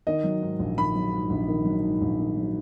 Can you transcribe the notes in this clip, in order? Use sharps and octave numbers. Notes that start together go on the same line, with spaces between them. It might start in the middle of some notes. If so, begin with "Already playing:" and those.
D#3 D#5
F#3
G#2
A#1
D#3 B5
F#3
G#2
A#1
D#3
F#3
G#2
A#1
D#3
F#3